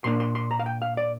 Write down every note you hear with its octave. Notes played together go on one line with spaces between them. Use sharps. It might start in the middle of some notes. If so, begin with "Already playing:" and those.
A#2 A#3 D4 C6
C6
C6
A#5
F5
G5
F5
D5